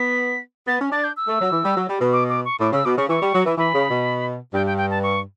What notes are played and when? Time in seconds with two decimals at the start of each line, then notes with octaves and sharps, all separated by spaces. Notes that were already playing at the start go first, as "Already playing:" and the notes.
Already playing: B3 B6
0.67 B3 A6
0.80 C#4
0.92 D4 A6
1.04 G6
1.17 E6
1.28 A3
1.41 F#3
1.52 E3
1.65 G3
1.76 F#3
1.89 G3
2.00 B2
2.13 D6
2.29 D6
2.45 C#6
2.60 A2 D6
2.72 C#3 E6
2.85 B2 D6
2.97 C#3 C#6
3.09 E3 C#6
3.22 G3
3.34 F#3
3.45 E3
3.57 E3 B5
3.74 C#3
3.90 B2
4.54 G2 G5
4.67 G5
4.78 G5
4.91 A5
5.03 C#6